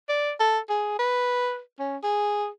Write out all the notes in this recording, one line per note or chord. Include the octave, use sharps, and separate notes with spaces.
D5
A4
G#4
B4
C#4
G#4